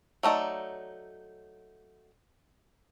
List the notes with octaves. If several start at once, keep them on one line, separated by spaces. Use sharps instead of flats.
F#3 A3 D#4 D5